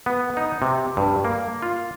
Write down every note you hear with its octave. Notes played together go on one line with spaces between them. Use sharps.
B3
D#4
C3
G2
A#3
F4